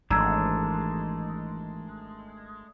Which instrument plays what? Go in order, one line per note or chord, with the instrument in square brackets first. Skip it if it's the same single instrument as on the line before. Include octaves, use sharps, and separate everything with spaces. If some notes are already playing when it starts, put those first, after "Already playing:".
[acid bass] G#1 [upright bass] E3 [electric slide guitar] G#3 A3 D4 [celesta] A#5 E6 G#6